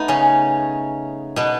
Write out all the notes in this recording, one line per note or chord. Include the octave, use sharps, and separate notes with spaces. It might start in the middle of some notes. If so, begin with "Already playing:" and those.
Already playing: A3 B3 D#4
C#3 C#4
B2 B3